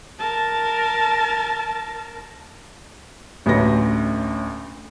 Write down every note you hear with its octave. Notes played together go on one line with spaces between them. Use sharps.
A#4 A5
A1 D2 A2 B4 A#6